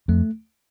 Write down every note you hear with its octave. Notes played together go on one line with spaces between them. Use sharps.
F2 A3